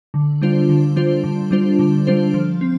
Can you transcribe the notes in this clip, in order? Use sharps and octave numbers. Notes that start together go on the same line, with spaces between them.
D3
G3 D4 F4 C5
D3
G3 D4 F4 C5
D3
G3 D4 F4 C5
D3
G3 D4 F4 C5
F3
C4